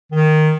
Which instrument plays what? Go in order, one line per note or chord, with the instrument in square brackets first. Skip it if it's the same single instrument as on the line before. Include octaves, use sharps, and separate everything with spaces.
[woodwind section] D#3